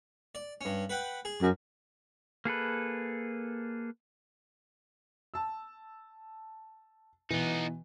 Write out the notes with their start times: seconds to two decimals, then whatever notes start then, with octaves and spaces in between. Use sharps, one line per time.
0.35 D5
0.61 G2 C#4
0.90 B4 F#5 G5
1.25 G#4
1.42 F#2
2.45 A#3 G#4 A4 B4
5.34 A5 E6
7.30 B2 E3 B3 D#4